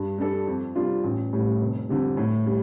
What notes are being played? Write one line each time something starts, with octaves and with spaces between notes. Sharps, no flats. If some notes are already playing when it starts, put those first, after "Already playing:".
Already playing: G2
G3 D4 A4
F2
C3 G3 D4 F4
A1
A2 G3
F1
F2 D3 G3
A2
G3